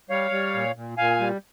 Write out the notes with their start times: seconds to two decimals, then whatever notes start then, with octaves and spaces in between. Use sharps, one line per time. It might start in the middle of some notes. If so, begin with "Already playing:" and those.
0.10 G3 C#5 F5
0.31 G3
0.54 A#2
0.76 A#2
0.97 A#2 F5 G#5
1.20 G3